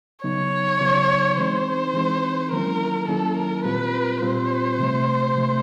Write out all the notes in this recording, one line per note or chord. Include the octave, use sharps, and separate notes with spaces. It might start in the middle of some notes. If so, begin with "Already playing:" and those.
C#3 F#3 B3 D#4 C#5
C#3 F#3 B3 D#4
E3 G#3 C4 D#4 C5
E3 G#3 C4 D#4
D#3 F#3 A#3 C#4 E4 A#4
D#3 F#3 A#3 C#4 E4 A4
A#4
A#2 G3 C4 F4 B4
A#2 G3 C4 F4 C5
C3 F3 A3
C3 F3 A3